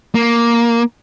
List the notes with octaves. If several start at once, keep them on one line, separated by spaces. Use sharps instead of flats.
A#3